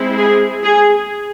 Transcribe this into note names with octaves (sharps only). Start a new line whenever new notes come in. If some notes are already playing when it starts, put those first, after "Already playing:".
Already playing: G#3 C4 E4
G#4
G#4